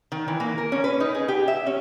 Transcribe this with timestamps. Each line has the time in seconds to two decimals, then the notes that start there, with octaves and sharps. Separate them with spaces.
0.12 D#3
0.28 E3
0.40 A#3
0.58 A#4
0.72 C#4
0.84 B4
1.00 D#4
1.15 G#4
1.28 G4
1.48 E5
1.67 C#4